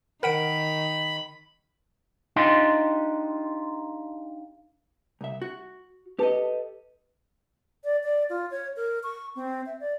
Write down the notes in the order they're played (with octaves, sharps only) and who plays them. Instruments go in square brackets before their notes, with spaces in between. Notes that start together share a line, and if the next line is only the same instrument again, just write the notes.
[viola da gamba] D#3 [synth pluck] A#4 F#5 D7 [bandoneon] B5
[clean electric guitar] D4 D#4 F4 G4 D#5 C6
[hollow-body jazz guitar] C2 E5
F#4
[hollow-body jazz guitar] G4 A4 D#5 [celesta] B4 A5
[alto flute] D5
D5
F4
C#5
A#4
C#6
C4
E5
D5